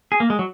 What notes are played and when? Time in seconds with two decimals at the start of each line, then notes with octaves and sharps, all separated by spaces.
0.12 G#4
0.20 A#3
0.30 G#3
0.39 F#3